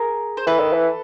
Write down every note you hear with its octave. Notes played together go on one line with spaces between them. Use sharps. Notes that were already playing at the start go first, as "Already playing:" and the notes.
Already playing: G#4 A#4
C5
E3 A4 B4
D#3
E3